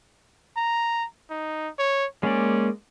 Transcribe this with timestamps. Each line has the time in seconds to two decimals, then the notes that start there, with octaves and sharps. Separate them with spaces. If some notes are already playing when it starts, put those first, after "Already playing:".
0.57 A#5
1.31 D#4
1.79 C#5
2.23 G#3 A#3 C#4 D5